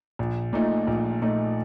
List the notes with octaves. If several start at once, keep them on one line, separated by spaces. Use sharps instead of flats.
A#1
A#2 A3 D#4
A#1
A#2 A3 D#4